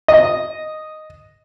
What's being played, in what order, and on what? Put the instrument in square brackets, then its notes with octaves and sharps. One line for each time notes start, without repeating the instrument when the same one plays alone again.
[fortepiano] D#5